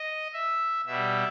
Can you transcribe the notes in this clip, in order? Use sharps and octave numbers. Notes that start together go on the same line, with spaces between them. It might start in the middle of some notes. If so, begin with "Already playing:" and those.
Already playing: D#5
E5
B2 G3 E5